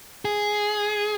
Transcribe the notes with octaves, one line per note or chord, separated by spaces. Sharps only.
G#4